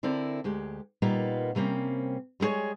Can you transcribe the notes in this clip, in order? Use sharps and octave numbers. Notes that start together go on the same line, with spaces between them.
D3 C4 E4 A#4 D5
D2 G#3 G4
A#2 G3 A#3 B3 D#4 F4
C3 G3 A#3 C4 C#4
G3 G#3 B3 G#4 C#5